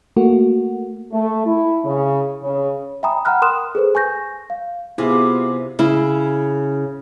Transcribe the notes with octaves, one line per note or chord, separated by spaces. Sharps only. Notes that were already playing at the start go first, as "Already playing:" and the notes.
A3 A#3 F#4
A3
E4
C#3
C#3
E5 G5 G#5 A#5 B5 D#6
F#5 G5 A#5 B5 F6 F#6
A#4 C6 D#6 F#6 E7
G#4 A4 B4 C5
G#5 C#6 G6 A#6
F5
C3 B3 E4 F4 G#4
C#3 E4